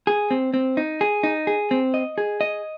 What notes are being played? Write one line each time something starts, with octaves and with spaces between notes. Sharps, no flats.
G#4
C4
C4
D#4
G#4
D#4
G#4
C4
D#5
G#4
D#5